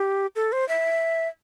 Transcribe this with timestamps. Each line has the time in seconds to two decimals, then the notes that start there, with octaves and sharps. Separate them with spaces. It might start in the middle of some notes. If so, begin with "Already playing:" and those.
Already playing: G4
0.36 A4
0.52 C5
0.69 E5